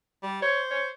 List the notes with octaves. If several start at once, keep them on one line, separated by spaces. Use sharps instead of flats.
G3
C5 C#5
C#5